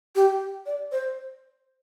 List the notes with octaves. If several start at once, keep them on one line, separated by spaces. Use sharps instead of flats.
G4
D5
C5